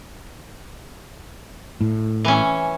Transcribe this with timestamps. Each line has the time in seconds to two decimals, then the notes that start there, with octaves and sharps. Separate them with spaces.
1.81 A2
2.25 E3 C#4